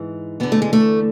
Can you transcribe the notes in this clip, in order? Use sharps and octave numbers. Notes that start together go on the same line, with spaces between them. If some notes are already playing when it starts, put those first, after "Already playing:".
Already playing: G#2 E3
E2 D3 B3
A3
G#3
A3